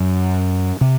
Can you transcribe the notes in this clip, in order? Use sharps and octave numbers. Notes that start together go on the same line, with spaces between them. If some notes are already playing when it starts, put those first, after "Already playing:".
Already playing: F#2
C3